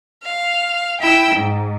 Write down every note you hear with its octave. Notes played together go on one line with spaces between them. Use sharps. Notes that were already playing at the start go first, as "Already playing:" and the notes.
F5
E4 G5 E6
G#2